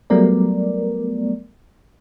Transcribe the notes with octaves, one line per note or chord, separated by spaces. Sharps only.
F#3 G3 A3 B3 A#4 D5